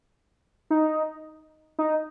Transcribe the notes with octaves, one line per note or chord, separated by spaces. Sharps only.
D#4
D#4